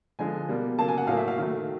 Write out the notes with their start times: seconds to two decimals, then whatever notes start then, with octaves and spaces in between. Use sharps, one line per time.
0.19 D3 F3 G#3 G#5
0.48 B2 G3 A#3
0.79 C#3 F#3 A#3 A5
0.88 G#5
0.98 F#5
1.07 A2 F#3 A#3 F5
1.17 E5
1.28 F5
1.38 D#3 F#3 A3